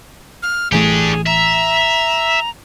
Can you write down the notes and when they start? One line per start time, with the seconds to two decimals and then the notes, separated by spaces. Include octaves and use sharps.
0.43 F6
0.72 A1 E3 A3 D4 G4 G#4
1.27 E5 A#5